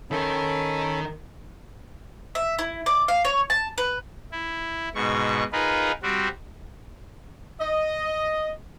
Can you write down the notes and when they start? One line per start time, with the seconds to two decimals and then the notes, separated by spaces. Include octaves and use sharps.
0.11 D#3 C#4 A4 A#4 B5
2.35 E5
2.59 E4
2.86 D5
3.08 F5
3.25 C#5
3.50 A5
3.78 B4
4.32 E4
4.95 G#2 B2 C#6
5.53 D#4 F4 G#4 A#4 B4
6.03 G3 C4 F#4
7.60 D#5